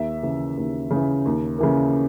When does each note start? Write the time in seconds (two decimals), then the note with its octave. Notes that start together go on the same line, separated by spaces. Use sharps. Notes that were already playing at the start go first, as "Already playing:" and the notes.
Already playing: D#2 E5
0.23 C#3 E3
0.57 D#2
0.90 C#3
0.96 E3
1.26 D#2
1.58 C#3 E3 A#3